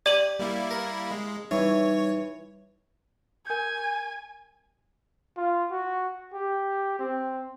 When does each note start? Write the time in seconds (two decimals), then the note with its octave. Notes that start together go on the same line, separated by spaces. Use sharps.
0.06 G4 D5 D#7 F#7
0.39 G3 A#3 E4
0.71 A#4
1.11 G#3
1.51 E3 G3 D#4 C#5
3.47 A#4 G#5 G6
5.37 F4
5.71 F#4
6.33 G4
6.99 C4